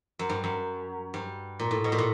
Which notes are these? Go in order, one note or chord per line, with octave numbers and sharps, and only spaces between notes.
F#2
G2
F#2
G2
A#2
A2
B2
A#2
A2